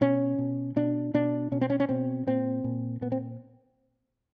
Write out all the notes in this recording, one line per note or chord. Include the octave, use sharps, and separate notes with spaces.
B2 C#4
B2
B2 D4
B2 D4
B2 C#4
C4
C#4
C#4
B2 C4
A#2 C4
A#2
A#2 B3
C4